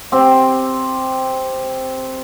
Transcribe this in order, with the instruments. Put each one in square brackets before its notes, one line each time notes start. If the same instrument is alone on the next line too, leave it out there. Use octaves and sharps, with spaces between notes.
[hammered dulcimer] C4 G4